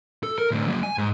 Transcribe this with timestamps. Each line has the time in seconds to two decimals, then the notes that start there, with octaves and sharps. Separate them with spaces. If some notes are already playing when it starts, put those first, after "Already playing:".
0.23 A4
0.38 A#4
0.51 D2 A2
0.68 F#3 A#3
0.83 G#5
0.98 G#2